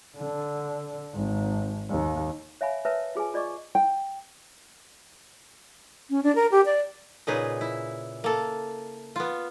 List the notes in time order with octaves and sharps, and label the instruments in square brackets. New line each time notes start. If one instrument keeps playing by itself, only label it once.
[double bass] D3
G#1
D#2
[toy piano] C#5 E5 F5 G#5 B5
A#4 B4 C#5 E5 A5
F4 G#4 B4 G#5
F4 D5 D#5 C#6 D6
[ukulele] G5
[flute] C#4
D4
A#4
G4
D5
[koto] A#2 C#3 D#4 G#4 B4
E4
A#3 A4
B3 F4